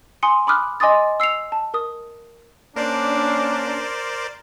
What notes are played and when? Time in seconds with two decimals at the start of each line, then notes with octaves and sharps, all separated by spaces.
0.23 G#5 C6 D#6 C#7
0.47 B5 D6 D#6 F6 F#6
0.80 D#5 G#5 C6 D6 D#6 A6
1.20 E6 C7 C#7 F7
1.52 A5
1.74 A#4 D#6
2.76 A#3 C#4 D4 A#4 C5 D5